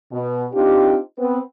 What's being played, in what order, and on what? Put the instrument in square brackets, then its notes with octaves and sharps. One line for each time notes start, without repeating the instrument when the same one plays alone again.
[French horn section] B2
C4 D4 D#4 F4 G4
B3 C4 B4